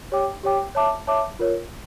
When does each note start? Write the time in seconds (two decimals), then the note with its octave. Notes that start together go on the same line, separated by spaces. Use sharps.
0.12 G4 C#5 G5 D6
0.43 G4 C#5 G5 D6
0.75 C#5 E5 A5 D6
1.07 C#5 E5 A5 D6
1.39 F4 A#4 C#5